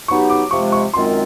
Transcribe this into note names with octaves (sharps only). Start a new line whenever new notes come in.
F#3 B3 D#4 G4 C#6
D6
C3 F3 G#3 C#6
C#6
F#2 D#3 G#3 C4 F4 C6